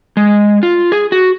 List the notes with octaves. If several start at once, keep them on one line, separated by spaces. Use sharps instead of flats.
G#3
F4
G#4
F#4